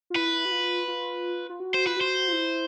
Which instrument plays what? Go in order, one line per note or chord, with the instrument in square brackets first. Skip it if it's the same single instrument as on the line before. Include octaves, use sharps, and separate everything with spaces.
[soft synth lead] F4
[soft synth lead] E4 [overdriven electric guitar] B4
[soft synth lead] F#4
F4
F4
F4
F#4
[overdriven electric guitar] C5
[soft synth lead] F4 [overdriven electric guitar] B4
[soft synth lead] F#4 [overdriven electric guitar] C5
[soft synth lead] F4
E4